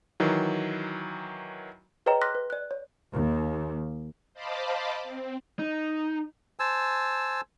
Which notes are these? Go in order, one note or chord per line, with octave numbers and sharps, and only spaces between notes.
D#3 E3 F#3
G#4 B4 C#5 D#5 G5 A#5
C6 D6 F6 F#6 A#6 B6
B4
D5 F#6
C#5
D#2
C5 D#5 F5 A5 B5 D6
C4
D#4
C5 G#5 A5 E6